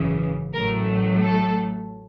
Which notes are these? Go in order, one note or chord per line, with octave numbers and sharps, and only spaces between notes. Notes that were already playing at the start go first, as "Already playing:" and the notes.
Already playing: G#1 F#2 C#3 E3
A1 A2 F#3 A3 A#4
A4